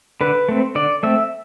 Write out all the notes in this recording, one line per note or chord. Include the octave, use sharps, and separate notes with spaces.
D3 B4
A3 C4
D3 D5
A3 C4 E5